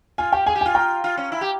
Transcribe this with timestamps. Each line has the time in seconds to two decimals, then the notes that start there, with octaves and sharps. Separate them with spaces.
0.18 F4 G#5
0.32 G4 G5
0.46 G#4 G#5
0.55 G4
0.61 F4 G#5
0.75 G5 A#5
1.04 F4
1.17 C#4
1.32 E4
1.41 G4